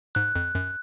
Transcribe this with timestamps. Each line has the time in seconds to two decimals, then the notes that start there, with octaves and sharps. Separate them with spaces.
0.15 G#2 F#6
0.36 F2
0.55 F#2